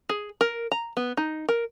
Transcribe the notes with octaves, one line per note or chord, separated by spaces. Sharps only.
G#4
A#4
A#5
B3
D#4
A#4